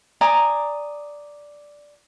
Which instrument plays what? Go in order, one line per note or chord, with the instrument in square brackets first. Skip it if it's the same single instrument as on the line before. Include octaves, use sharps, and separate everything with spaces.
[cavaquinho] D5 G#5 A#5 D#6